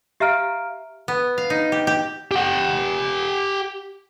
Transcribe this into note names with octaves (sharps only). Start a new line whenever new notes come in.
G4 E5 F5 A#5 F6 D7
B3
F5
D#4
G4
G4
G4 F#5